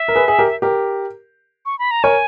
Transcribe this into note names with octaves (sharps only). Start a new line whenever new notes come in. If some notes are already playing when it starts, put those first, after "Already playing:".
Already playing: E5
A#4
G#4 B4
G#4
G4 A#4
G4 A#4
C#6
B5
A#5
A#4 C#5 G#5